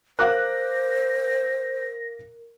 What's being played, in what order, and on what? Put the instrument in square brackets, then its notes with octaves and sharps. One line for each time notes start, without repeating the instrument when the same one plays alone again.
[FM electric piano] A#4 [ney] C5 [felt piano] F5 D6 F#6 [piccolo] A#6